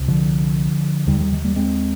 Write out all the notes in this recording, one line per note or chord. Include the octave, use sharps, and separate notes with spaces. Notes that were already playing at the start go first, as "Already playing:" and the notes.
Already playing: C2 C3
D3 F3
D#2 D3 D#3 G3
D#3 G3
D#3
G3 A#3
G#3 C4